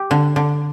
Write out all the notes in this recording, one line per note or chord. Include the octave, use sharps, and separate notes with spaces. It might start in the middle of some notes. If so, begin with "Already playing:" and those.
Already playing: G4
D3
D3